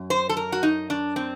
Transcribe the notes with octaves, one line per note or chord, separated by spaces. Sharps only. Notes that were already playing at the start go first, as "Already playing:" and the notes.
Already playing: F#2
C5
A4
A#4
F#4
D#4
D4
C4